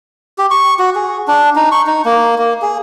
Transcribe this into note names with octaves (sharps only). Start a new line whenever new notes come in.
G4
C#6
F#4
G#4
D4
D#4
C#6
D#4
A#3
A#3
G#4